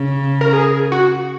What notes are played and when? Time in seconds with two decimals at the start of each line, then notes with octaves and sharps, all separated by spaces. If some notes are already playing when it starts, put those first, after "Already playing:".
Already playing: C#3
0.41 A#4
0.53 G#4
0.92 F#4